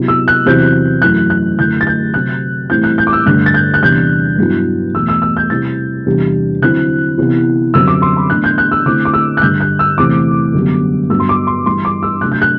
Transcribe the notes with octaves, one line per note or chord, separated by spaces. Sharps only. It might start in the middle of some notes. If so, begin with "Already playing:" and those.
Already playing: C3 F#3 B3 E4
E6
F#6
E2 C3 F#3 C4 E4 G6
F#2 E3 A3 F#6
F#6
F#2 D3 A3 E4 G6
A6
G6
C3 F#3 C4 F#6
A2 E3 G3 C4 E4 G6
F#6
G6
D6
E6
G2 D3 A3 F#6
A6
G6
F#6
E2 C3 G3 D4 G6
G2 F#3 B3 E4
E2 B2 A3 E6
E6
E6
G6
C3 G3 C4 E4 A6
E2 C3 G3 D4
D3 F#3 C4 E4 F#6
C3 E3 B3 E4
F#2 D3 G3 C4 E6
D6
C6
B5
A2 E3 B3 D4 F#6
G6
F#6
E6
D3 A3 C4 E4 D6
D6
E6
F#6
G2 D3 G3 G6
F#6
E6
E2 C3 E3 A3 C4 D6
F#2 D3 G3 B3
G2 F#3 B3 E6
C6
D6
C6
G2 E3 G3 C6
D6
E6
C3 F#3 A3 D4 F#6
G6
F#6